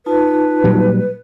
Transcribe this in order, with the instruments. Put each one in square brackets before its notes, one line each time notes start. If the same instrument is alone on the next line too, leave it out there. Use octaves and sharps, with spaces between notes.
[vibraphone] D#4 F4 A5 [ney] B4
[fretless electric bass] A#2 F#3 G3